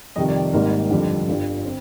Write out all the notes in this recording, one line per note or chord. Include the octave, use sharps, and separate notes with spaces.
F2 C3 D#3 G3 D#5
D5
G#1 G#2 G3 A#3 A#4
G1 F2 D3 G3 C4
G1 G2 D3 G3 F4
C4